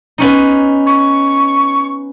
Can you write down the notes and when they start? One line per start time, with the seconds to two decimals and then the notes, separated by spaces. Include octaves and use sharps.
0.18 B3 C#4 D#4
0.87 C#6